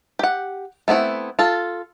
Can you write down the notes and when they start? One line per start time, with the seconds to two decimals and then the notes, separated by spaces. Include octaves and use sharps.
0.19 G4 F#5
0.88 A3 B3 C4 E4
1.39 F4 A4